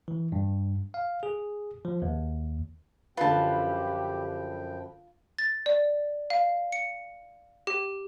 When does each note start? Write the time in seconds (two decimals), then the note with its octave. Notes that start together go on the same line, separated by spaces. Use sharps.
0.08 E3
0.32 G2
0.94 F5
1.23 G#4
1.85 F3
2.02 D#2
3.17 F#2 D3 F3 F4 G4 B4 G5 A5
5.38 A6
5.66 D5
6.30 F5
6.72 C#7
7.67 G4